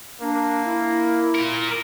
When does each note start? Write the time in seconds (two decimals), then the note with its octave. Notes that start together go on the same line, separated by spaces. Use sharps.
0.21 A#3 D4
0.64 E4
1.35 F4 A#4